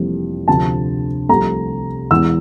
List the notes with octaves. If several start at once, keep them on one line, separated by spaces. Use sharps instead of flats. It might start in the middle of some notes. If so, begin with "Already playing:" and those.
Already playing: F1 F2 E3 G3 A#3
D2 C3 F3 A5
C2 C3 F3 A3 A#5
E1 E2 E3 E6